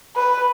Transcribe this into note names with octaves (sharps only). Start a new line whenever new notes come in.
B4